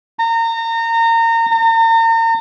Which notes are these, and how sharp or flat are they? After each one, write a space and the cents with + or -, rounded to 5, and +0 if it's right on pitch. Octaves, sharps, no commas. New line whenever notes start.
A#5 -30
A#5 -40